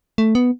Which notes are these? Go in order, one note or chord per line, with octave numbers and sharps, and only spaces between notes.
A3
B3